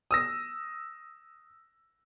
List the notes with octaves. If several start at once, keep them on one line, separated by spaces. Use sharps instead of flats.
D#6 E6 A#6